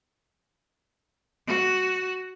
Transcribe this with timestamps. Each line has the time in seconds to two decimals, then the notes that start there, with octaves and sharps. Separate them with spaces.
1.47 F#4